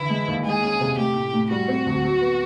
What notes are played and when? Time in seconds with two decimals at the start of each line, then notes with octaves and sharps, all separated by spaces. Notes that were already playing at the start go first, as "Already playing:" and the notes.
Already playing: D3 E3 E4
0.10 G#3
0.27 D#2
0.45 G#3 G#4
0.63 C#4
0.80 C3
0.98 A3 G4
1.16 A2
1.34 A2
1.51 G3 F#4
1.68 C4
1.86 D2
2.04 F#3
2.21 B3